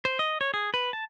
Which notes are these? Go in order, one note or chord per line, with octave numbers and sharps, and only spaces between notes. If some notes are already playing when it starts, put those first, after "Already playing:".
C5
D#5
C#5
G#4
B4
A5